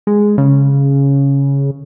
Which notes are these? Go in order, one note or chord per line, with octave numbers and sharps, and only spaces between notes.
G#3
C#3